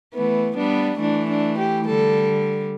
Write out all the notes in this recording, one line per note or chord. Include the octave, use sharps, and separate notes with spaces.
E3 A3 B3
G3 B3 D4
E3 A3 D4
D4
G4
D3 G3 A4